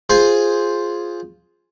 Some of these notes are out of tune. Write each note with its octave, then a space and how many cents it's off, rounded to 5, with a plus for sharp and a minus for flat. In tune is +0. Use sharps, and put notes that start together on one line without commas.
F4 +0 G#4 +0 C5 +0